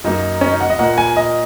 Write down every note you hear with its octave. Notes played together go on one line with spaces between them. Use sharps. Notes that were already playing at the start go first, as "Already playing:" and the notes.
F#2 F#3 A#3 D#4
C#4
D#4
F#5
D#5
A#2 A#3 F#5
G#5
D#5